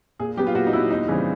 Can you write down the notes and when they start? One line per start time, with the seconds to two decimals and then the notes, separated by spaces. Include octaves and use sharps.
0.19 A#2 G#4
0.37 F#3 B3 G4
0.47 F4
0.55 A#2 F#4
0.67 D#4
0.73 F#3 B3 E4
0.90 D#2 D#4
1.08 C#3 E3 G3 C4